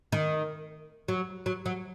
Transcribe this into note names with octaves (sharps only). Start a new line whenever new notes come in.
D#3
F#3
F#3
F#3